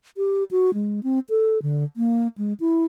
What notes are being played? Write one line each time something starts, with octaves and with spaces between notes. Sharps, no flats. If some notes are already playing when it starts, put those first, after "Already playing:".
G4
F#4
G#3
C4
A4
D3
A#3
G#3
E4